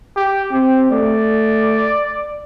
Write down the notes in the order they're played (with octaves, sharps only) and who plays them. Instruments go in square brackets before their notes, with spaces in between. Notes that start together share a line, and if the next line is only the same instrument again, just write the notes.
[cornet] G4
[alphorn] C4 [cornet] G4
[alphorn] A3 [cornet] D5